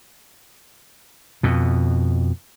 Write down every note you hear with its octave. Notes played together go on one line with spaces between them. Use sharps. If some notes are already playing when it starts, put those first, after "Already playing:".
F2 B2